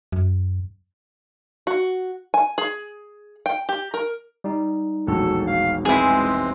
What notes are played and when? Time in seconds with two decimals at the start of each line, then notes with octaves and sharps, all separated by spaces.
0.12 F#2
1.67 F#4
2.34 G#5
2.58 G#4
3.46 G5
3.69 G4
3.94 A#4
4.44 G3 D#4
5.07 E1 A#1 F#4 A4
5.47 F5
5.85 E3 G#3 C4 E4 G#4